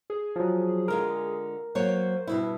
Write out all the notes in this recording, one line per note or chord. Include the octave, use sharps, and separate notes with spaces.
G#4
F3 F#3
D3 G#3 F4 A#4
F#3 A#3 C5 C#5
G2 B2 E4